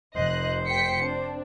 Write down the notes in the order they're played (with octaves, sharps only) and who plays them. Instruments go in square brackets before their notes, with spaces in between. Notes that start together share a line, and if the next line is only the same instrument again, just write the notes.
[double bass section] F1 [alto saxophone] C5 [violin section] D#5 F#6
[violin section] G5 B6 C#7
C4 D4